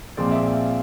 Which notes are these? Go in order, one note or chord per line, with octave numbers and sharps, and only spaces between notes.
A#2 F3 G#3 C4 D5
E5
F5